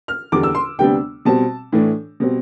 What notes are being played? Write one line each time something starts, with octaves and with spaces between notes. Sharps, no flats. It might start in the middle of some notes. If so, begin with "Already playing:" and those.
F6
E2 D3 G3 D4 D6
E6
C6
D2 C3 G3 B3 D4 G5
B2 G3 C4 A5
A2 E3 A3 D4
B2 G3 C4